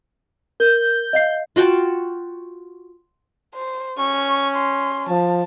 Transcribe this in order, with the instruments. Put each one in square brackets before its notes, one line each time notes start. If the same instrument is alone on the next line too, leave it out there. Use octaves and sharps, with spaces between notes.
[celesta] A#4 [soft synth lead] G6
[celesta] D#5 F5 C7
[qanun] F4 F#4 G5 A5
[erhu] C5
[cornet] C#4 [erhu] C#6
[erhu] C6
[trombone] F3 [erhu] A5